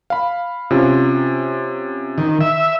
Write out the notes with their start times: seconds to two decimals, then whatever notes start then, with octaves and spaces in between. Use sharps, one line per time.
0.10 F5 B5
0.71 C3 C#4 F4
2.18 D#3
2.41 E5